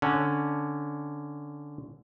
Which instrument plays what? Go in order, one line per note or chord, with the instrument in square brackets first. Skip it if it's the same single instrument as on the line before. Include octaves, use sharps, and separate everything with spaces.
[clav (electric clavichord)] D3 C#4